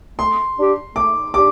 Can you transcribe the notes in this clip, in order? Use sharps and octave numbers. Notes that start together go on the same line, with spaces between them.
A3 C6
D4 G4
A3 D6
D4 G4 D6